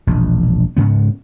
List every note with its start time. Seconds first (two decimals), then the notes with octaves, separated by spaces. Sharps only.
0.07 E1 A#1
0.77 G#2 C#3 B3